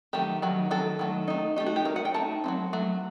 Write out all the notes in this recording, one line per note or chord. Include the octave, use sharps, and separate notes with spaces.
D#3 F#3 A3 G4
D#3 F#3 A3
D#3 F#3 A4
D#3 F#3 A3
A3 D#4
A3 D#4 G4
F#4
G4
A3 D#4 A#4
F#5
G5
A3 D#4 A5
F#3 A3 C4
F#3 A3